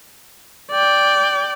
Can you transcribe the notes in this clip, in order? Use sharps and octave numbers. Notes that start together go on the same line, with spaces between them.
D5 G5